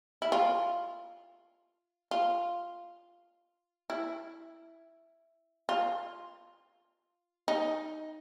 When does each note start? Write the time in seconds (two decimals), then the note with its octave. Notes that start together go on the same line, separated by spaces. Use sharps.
0.22 E4
0.32 F4
2.11 F4
3.90 E4
5.69 F4
7.48 D#4